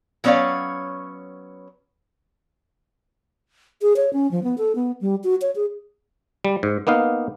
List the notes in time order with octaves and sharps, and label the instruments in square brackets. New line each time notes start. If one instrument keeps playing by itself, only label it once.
[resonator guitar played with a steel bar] F#3 B3 C#4 C#5 D5 F5
[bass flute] G#4
C#5
C#4
F3
B3
A4
B3
G3
F#4
C#5
G#4
[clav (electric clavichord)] G3
G#2
A#3 B3 D#4 F5